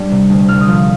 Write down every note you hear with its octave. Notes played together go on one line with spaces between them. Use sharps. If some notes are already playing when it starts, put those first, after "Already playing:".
Already playing: G3 D4
C3
D2
C2 F6
D#6
F3 F6